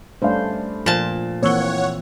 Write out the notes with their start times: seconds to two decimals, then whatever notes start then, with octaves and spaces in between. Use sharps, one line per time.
0.22 G2 A3 C#4 D4 C5 F5
0.86 A#2 F3 C5 A5
1.43 E3 A#3 C4 C#5 F#5 C#6 E6 G7